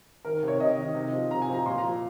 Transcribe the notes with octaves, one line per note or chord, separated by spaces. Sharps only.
D#3 A#4
C3
C#5
C3 D#5
D#3
C3
F3
C3 A#5
G#5
F3
A#5
A#2 C6
A#5
F3